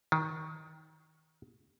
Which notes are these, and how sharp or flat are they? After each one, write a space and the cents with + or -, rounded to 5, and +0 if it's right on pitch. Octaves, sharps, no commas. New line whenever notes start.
D#3 +20